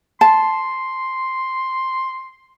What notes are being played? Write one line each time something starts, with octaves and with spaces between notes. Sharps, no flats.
A5 C6